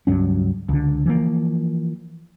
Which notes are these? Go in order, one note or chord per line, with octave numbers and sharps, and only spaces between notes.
C#2 G2 F#3 C#4
C#2 D3
E3 F3 A#3